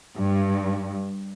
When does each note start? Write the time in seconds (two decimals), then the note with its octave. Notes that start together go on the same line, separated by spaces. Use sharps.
0.16 G2